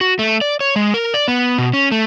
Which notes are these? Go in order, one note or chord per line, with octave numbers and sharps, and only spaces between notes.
F#4
A3
D5
C#5
G#3
A#4
D5
B3
B2
C#4
A3